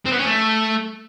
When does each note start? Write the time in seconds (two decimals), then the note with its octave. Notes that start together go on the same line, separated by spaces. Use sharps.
0.06 C4
0.12 B3
0.19 C#4
0.25 A3